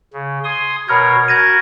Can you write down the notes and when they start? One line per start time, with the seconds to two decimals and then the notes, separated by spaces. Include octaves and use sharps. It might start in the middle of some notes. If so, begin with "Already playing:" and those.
0.13 C#3
0.44 G#5 C6 D#6
0.89 B2 A#4 C#5 B5 F6 G#6
1.28 F#4 A#4 G#6 A#6 D#7